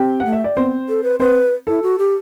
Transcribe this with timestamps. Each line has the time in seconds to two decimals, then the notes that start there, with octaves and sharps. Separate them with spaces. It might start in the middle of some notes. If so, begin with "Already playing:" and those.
Already playing: C4 G4 G5
0.20 F#5
0.25 A3
0.32 E5
0.44 D5
0.56 B3 C4 C5
0.89 A4
1.04 B4
1.20 C4 B4 C5
1.67 E4 A4
1.83 F#4
1.98 G4